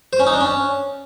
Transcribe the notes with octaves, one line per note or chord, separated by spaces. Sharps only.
C5
C#4
D#4
D4
C#4